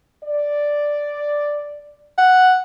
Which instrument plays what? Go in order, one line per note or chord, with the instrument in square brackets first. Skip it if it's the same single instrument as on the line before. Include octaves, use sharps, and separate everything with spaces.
[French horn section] D5
[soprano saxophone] F#5